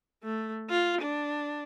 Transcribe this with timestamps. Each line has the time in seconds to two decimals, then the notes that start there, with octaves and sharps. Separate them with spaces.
0.23 A3
0.70 F4
1.02 D4